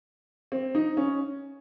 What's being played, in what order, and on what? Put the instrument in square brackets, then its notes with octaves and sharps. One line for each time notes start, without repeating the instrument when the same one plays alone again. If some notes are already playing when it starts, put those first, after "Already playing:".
[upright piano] C4
D#4
C#4